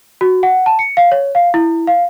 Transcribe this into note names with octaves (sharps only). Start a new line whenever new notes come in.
F#4
F#5
A5
C#7
F5
C#5
F5
E4
F5